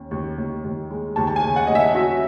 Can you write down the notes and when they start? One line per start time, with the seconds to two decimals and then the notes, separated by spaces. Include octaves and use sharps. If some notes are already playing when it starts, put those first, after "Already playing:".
Already playing: D#2 C#4
0.11 D#2
0.38 D#2
0.64 D#2
0.91 G#3
1.16 D#2 A5
1.27 A5
1.36 G#5
1.43 C#3
1.56 F#5
1.67 D#2 D#5
1.75 E5
1.95 C#4 F#4